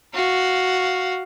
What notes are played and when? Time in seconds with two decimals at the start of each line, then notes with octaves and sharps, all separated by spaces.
0.14 F#4 F5